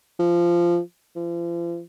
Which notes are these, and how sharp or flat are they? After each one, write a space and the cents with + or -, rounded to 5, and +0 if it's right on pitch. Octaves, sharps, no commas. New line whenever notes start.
F3 -15
F3 -40